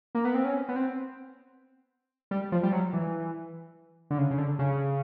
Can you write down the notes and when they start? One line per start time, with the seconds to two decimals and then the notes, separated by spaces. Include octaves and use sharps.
0.15 A#3
0.25 B3
0.35 C4
0.44 C#4
0.69 B3
0.76 C4
2.31 G3
2.52 F3
2.63 G3
2.73 F#3
2.93 E3
4.11 D3
4.18 C#3
4.31 C#3
4.38 D3
4.59 C#3